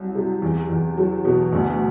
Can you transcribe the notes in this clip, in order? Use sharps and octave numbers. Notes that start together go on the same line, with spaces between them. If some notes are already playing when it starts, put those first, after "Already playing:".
Already playing: C2 F#3
C3
E2
E2
F#3
B2
D2